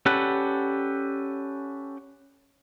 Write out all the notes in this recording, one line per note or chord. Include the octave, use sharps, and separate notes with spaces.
C#4 G4 A4 B4 D5 F#5